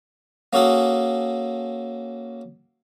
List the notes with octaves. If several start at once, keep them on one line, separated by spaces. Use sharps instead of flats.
A#3 C#4 F#4 G#4 A4